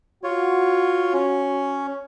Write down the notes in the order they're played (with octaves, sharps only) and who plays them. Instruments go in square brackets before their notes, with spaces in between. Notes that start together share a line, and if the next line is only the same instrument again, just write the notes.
[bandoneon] F4 C#5 [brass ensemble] F#4
[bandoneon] C#4